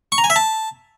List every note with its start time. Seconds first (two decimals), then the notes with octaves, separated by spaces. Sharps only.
0.12 C#6
0.18 A#5
0.24 G#5
0.30 E5
0.36 A5